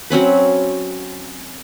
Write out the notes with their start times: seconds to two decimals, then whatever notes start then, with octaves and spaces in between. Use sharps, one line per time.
0.10 F#3 C4 C#4 B4